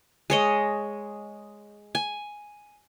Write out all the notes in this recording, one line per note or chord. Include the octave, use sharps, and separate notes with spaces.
G#3 C#5 D#5
G#5